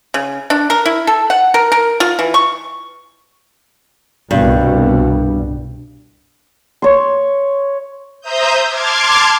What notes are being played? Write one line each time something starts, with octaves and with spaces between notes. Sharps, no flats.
C#3
D4
A#4
E4
A4
F#5
A#4
A#4
F4
E3
C#6
C2 G2 B2
C#5 C6
C5 E5 A#5 D#6 G6
A5 C6 D6 F6 G#6